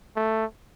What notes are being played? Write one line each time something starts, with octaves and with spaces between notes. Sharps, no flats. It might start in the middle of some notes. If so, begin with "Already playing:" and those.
A3